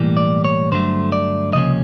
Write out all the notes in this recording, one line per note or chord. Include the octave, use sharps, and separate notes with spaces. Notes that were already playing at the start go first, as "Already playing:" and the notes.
Already playing: B1 A2 E3 G3 A#3
D5
C#5
G2 D3 F#3 A3 C5
D5
C#2 C3 F3 A#3 C#4 D#5